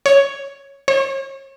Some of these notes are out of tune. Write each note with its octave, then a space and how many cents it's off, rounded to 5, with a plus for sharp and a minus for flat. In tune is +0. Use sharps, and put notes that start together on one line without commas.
C#5 +0
C#5 -40